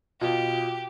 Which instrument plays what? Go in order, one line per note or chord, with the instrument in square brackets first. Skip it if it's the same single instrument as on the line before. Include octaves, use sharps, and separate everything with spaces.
[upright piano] B2 F4 [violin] G4